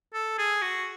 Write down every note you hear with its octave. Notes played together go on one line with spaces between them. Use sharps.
A4
G#4
F#4